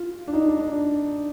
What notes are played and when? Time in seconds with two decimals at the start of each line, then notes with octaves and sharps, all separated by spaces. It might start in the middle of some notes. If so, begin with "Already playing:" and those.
Already playing: F4
0.28 D4
0.33 D#4
0.48 D#4
0.59 D4